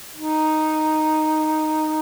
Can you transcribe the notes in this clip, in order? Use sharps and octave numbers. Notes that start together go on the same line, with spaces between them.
D#4